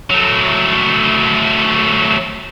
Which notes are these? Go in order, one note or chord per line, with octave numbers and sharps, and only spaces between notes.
F#3 A3